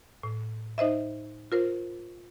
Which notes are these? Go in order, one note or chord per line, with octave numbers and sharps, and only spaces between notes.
A2
D#4 C5 D#5 E5
F4 A#4 C5